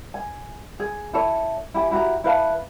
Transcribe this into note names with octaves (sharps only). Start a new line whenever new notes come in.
G#5
G#4
E4 A4 C#5
E4 G4 G#5
E4 F#4 G4 A#5
E4 B4 F5 A5